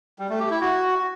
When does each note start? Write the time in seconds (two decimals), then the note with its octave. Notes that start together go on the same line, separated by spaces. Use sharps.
0.19 G3
0.29 A3
0.40 G4
0.50 E4
0.61 F#4